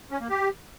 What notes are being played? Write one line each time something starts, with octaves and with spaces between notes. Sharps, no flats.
C#4
A#3
G4